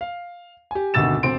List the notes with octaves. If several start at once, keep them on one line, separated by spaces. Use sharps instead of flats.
F5
G4 G#5
G#1 D2 B2 E6 A6 E7
E1 C4 C6 D7